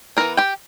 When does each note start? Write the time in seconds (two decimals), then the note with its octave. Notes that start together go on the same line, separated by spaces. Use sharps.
0.17 E3 B3 D4 A#4 A#5
0.37 G4 G5